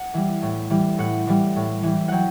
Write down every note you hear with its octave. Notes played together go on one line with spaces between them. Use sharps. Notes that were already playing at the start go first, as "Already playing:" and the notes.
Already playing: F#5
E3 G3
A2
E3 G3
A2 F#5
E3 G3
A2
E3 G3
F#3 F#5 G5